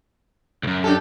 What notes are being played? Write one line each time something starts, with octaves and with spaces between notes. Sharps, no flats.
C#2 F#2
D4 G4 A4